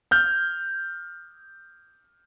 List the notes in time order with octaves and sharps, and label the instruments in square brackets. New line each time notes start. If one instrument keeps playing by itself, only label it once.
[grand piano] F6 G6